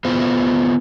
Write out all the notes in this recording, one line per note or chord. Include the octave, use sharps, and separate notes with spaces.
B3 E4 F4 C5